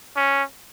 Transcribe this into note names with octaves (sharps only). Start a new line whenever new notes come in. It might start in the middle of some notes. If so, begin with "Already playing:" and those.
C#4